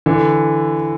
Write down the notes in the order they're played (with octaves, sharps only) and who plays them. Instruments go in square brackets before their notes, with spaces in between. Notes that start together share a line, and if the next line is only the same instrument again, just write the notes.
[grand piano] D3 E3